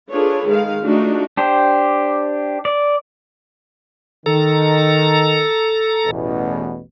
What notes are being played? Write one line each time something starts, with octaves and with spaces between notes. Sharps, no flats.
D4 F4 G#4 A4 B4 C#5
D#3 G#3 F5
A3 D4 D#4 F4 F#4
D4 G4 C5
D5
D#3 A4 A#5
A1 E2 B2